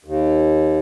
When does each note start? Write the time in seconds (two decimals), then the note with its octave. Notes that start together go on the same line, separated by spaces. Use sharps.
0.05 D#2